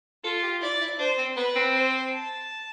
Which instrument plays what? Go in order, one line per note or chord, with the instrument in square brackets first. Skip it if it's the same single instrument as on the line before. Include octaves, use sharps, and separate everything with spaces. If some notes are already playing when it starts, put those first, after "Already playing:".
[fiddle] F4 [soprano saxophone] A4
[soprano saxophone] G4
[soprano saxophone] E4 [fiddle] D5
[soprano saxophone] E4
[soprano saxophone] D4 [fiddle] C5
[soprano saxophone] C4
[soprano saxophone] B3 [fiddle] B4
[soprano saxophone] C4
[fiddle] C5
A5